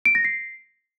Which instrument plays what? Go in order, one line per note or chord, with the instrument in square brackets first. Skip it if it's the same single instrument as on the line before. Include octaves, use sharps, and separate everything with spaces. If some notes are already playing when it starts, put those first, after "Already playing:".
[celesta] D7
A#6
C7